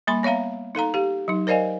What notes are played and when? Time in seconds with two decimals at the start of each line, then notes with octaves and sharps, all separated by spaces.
0.07 G3 A#3 B5 C6
0.23 B3 C#5 E5 F5 A#5
0.75 D#4 A4 F5 A#5
0.94 G4 F5
1.28 F#3 D#4
1.47 A#4 C5 D5 D#5 F5 G#5